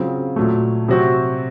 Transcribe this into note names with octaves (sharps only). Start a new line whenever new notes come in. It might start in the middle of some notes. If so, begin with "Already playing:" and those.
Already playing: C#3 F#3 C4 F4
A#2 F#3 A3
C3 F#3 C4 F#4